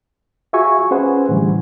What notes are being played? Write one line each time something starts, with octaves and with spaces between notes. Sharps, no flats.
F4 F#4 G#4 E5 G#5 C#6
C#4 G#4 B4 C5 F#5 G#5
A2 D3 E3 G3